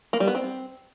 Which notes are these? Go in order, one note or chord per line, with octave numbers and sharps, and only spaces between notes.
A#3
G3
B3
C4